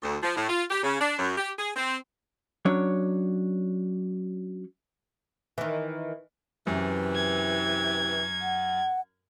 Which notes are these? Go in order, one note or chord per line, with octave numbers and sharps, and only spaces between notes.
D2
F3
A2
F4
G4
C#3
D4
F#2
G4
G#4
C4
F#3 C#4 D4 C#5
D#3 E3
F#2 C3 E3
G#6
F#5